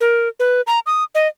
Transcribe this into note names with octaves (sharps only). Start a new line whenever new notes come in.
A#4
B4
A#5
D#6
D#5